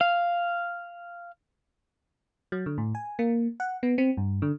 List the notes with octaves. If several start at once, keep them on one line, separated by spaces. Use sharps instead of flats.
F5
F#3
D3
A2
G#5
A#3
F#5
B3
C4
G2
D3